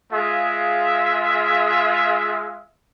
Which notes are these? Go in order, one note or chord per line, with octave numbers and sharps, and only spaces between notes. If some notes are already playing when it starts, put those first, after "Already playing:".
G#3 F4 G#4 E5 F5